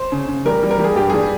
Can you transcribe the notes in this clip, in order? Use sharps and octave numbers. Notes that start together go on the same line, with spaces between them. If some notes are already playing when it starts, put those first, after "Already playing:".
Already playing: C5
C#3
C#3
G3 A#4
G3
A#4
G3
G#4
G2 G4
G3 G#4